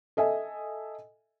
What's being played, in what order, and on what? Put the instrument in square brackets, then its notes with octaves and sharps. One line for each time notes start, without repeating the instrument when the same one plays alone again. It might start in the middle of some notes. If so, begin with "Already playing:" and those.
[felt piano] A4 D#5 E5 G#5